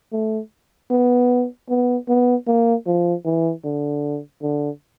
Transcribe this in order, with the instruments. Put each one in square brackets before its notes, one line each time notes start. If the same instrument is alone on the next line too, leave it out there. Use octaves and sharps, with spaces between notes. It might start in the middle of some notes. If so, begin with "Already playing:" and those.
[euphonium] A3
B3
B3
B3
A#3
F3
E3
D3
D3